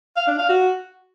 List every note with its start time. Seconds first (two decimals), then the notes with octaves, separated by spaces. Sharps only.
0.17 F5
0.28 D4
0.38 F5
0.49 F#4